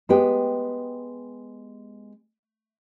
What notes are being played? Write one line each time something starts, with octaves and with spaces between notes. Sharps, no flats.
G#3 B3 G4 B4 G5 A5